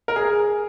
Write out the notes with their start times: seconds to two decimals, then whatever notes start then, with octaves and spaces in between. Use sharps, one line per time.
0.08 A#4
0.16 G#4